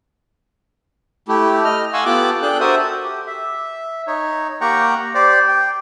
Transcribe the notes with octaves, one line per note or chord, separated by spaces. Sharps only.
A3 E4 G4
D#5 F6
F5 F#5 G#5 C6 C#6 E6
B3 F4 G4 A4 D6 F#6
D4 G#4 A4 G5 F#6
F#4 A4 A#4 C5 E5 D#6
G4
E5
D#4 C#5
A#3 G4 F#5 G5 A#5 C#6
G4 C5 D5
G5